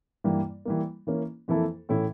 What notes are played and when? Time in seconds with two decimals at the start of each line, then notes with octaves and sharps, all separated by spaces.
0.24 G2 E3 G3 A#3
0.65 E3 G3 A#3
1.07 E3 A#3 C#4
1.48 F2 E3 A#3 E4 A4
1.89 A2 E3 A3 C#4 E4